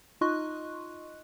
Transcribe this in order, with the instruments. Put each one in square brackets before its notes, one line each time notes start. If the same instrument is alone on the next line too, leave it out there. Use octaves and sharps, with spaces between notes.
[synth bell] D#4 F4 D#5 C6 C#6 F#6